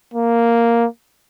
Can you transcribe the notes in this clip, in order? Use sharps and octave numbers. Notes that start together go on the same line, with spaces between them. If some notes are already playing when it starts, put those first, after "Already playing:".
A#3